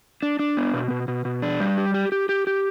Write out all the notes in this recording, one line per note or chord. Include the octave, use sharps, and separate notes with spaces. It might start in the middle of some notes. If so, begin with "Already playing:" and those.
D4
D4
B3
B2
B2
B2
B2
D4
G3
G4
G4
G4
G4
G4